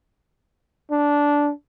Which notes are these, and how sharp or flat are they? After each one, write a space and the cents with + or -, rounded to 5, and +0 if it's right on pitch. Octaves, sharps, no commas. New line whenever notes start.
D4 -10